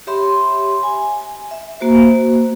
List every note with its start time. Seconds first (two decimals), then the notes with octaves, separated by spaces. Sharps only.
0.07 G4 C#5 E5 B5 C6
0.83 G#5
1.51 E5
1.80 A#3 F#4 C5